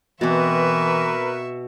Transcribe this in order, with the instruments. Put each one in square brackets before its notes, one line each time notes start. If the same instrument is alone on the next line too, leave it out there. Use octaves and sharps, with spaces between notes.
[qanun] B2 C4 [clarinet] E3 [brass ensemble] A#4 B4 [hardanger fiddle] E5 C#6